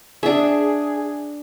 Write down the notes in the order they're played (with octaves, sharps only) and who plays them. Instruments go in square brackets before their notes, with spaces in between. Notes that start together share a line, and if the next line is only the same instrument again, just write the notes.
[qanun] D4 E5 [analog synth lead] G#4